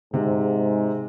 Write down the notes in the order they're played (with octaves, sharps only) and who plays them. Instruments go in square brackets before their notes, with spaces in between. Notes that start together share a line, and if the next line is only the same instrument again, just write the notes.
[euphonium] G#2 [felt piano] C3